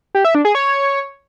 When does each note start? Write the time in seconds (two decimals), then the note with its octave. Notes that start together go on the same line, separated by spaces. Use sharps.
0.15 G4
0.25 E5
0.35 D4
0.45 G#4
0.55 C#5